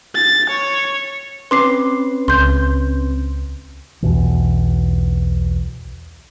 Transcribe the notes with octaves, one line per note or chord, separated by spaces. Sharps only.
A6
C#5
C4 C#4 B4 C6 D6 C7
C#2 C6 G6
B1 E2 B2 E3